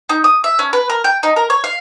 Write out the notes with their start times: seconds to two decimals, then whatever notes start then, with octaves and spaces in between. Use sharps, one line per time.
0.09 D#4
0.24 D#6
0.44 E5
0.59 C#4
0.73 B4
0.90 A#4
1.04 G5
1.23 D#4
1.36 A#4
1.50 C#5
1.64 F5